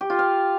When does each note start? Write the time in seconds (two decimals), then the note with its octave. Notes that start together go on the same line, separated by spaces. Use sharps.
0.01 G4
0.10 F4
0.19 F5